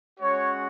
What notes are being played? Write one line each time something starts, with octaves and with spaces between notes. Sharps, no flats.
G#3 C#4 F#4 C#5